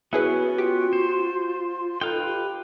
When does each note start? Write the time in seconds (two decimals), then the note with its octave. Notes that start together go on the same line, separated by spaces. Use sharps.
0.13 B3 C#4 E4 F#4 G#4 B4
0.58 F4 G4
0.93 C5
2.01 D#4 A4 B4 F5 G5
2.26 G4